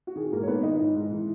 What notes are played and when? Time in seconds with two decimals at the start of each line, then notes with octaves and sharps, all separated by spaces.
0.07 F#4
0.16 D#3 G#4
0.32 G#2 A#3 A#4
0.43 C#5
0.48 D#3 B3 B4
0.63 D#3 D#4 D#5
0.80 G#2
0.96 G#2
1.11 E3